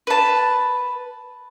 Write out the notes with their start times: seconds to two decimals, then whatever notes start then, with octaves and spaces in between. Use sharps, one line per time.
0.07 B4 A5